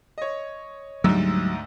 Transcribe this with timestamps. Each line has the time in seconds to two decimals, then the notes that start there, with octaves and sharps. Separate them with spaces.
0.18 C#5 D#5
1.04 D2 G#2 F#3 G3 E6